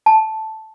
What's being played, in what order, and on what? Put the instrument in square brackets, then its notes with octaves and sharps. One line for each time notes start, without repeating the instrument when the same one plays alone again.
[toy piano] A5